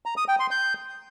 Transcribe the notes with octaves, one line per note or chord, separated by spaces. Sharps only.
A#5
D#6
G5
C6
G6